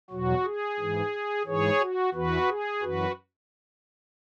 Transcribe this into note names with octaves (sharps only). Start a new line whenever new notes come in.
E2 B2 F#3 F#4
G#4
G#2 E3
G#2 E3 G#4 C#5
F#4
E2 E3 F#4 B4
G#4
F#2 E3 F#4 B4